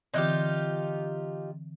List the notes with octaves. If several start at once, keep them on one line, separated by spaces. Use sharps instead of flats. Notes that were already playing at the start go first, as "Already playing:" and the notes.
D3 E3 C4 D#4 F4 G4